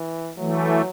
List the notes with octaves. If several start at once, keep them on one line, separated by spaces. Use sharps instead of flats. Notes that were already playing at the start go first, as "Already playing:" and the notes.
Already playing: E3
E3 F#3 A3